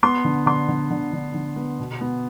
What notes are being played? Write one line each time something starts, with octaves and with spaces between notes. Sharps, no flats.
B3 C6
D3
D3 C6
D3
D3
D3
D3
B3
B2
B3